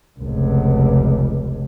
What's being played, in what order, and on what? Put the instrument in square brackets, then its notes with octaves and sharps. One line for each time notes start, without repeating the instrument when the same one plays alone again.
[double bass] F1 C#2